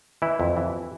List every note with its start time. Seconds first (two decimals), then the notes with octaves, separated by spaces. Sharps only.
0.22 E3 E4
0.40 F2
0.57 E3